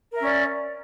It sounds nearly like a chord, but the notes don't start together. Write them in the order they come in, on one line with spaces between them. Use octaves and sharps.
A#4 E5 C#4 D5